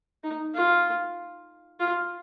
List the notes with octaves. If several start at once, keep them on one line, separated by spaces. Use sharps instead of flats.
D#4
F4
F4